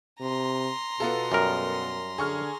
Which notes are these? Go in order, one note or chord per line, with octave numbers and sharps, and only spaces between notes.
C3 A#5 C6
B2 B3 F4 A4
F#2 G3 A#4
D3 G#4 C#6 F6